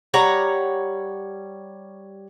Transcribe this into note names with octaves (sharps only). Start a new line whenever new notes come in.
G3 C#5 F#5 A#5